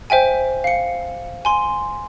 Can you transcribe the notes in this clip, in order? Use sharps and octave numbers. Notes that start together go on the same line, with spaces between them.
C5 E5 G5 G#5
F5 C#7
G#5 C6